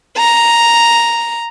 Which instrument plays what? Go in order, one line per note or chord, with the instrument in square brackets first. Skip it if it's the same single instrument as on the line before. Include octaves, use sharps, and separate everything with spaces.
[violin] A#5